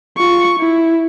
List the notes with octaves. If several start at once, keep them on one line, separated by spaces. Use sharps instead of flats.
F4 C#6
E4